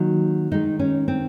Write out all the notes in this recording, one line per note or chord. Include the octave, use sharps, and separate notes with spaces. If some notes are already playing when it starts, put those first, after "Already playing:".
Already playing: D#3 F#3 A#3
D#3 G#3 D#4
C#4
C4